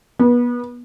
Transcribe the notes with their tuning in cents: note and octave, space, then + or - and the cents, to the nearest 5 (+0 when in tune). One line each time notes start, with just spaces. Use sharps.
B3 -30